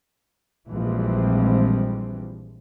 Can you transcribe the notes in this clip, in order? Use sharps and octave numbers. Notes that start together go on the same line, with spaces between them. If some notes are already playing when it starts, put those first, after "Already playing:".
A#1 E3 F3 G3 G#3 C4